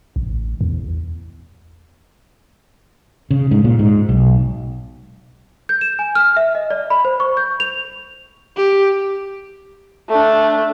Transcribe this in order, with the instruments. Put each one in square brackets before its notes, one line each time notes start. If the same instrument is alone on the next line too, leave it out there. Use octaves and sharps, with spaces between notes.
[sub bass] A1
E2
[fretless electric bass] C#3
G#2
A#2
G#2
B1
[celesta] G6
E7
G#5
F6
E5
D#5
D5
B5
C5
C#6
G6
F7
[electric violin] G4
[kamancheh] A3 D4